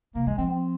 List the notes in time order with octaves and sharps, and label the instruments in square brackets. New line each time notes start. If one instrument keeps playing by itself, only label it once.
[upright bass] C3 [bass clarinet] A#3
[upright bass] D#3 [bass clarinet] G#3
[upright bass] F3 [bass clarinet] C4
[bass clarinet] C4